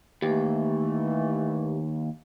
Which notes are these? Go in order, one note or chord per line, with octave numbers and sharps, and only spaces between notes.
D#2 E3 A3 G4